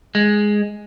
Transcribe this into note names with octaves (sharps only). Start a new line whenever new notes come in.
G#3